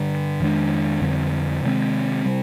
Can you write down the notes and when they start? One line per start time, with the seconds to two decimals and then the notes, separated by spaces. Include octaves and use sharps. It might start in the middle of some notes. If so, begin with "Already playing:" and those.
Already playing: G2 D3 G3
0.40 F2 D#3 G#3 D4
1.01 F2 D3 G3 C4
1.63 C3 D#3 G#3 C4
2.25 C3 G3